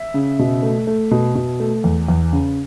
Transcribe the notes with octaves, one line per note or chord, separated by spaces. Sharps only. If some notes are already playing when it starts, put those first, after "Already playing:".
Already playing: E5
C#3
B2
A3
A3
B2
B2
A3
E2
E2
C#3